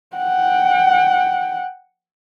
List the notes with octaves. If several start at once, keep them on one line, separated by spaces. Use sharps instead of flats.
F#5 G5